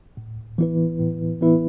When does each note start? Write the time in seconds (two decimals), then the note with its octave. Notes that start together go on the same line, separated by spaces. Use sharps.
0.17 A2
0.58 E3 B3 E4 B4
0.99 A2
1.41 E3 B3 E4 B4